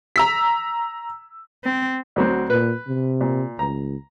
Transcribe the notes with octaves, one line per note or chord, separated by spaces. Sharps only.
A#5 E6 B6
C4
D2 F#3 C4
A#2 B4
C3
A#2
C#2 A#5